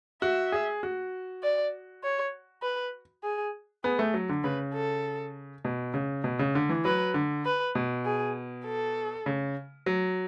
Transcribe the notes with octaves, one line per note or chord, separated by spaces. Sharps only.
F#4 E5
G#4
F#4
D5
C#5
B4
G#4
B3 G#4
A3
F#3
D3
C#3 B4
A4
B2
C#3
B2
C#3
D3
E3
F#3 B4
D3
B4
B2
G#4
A4
C#3
F#3